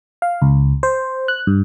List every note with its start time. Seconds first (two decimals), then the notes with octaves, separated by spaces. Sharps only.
0.22 F5
0.42 C#2
0.83 C5
1.28 F#6
1.47 G2